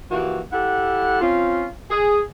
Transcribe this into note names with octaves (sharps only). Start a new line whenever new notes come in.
E3 F3 A#3 F#4 G4
E4 G4 A4 F#5
C4 C#4 F4
G#4